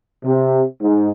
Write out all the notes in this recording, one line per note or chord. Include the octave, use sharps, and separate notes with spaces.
C3
G#2